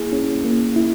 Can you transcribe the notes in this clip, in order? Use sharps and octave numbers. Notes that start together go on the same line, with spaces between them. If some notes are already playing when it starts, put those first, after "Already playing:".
Already playing: A#3 E4 G#4
C#4
A#3
E4